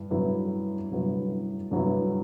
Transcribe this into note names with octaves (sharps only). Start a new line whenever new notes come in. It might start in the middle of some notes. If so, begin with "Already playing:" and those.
Already playing: G2 E4
G2 F#3 B3 E4
G2 F#3 B3 E4
G2 F#3 B3 E4